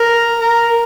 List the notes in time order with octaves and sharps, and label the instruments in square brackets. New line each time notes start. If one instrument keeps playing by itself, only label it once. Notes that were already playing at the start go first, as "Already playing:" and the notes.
Already playing: [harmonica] A#4
A#4